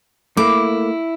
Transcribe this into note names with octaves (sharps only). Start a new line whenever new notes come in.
A3 A#3 E4 D6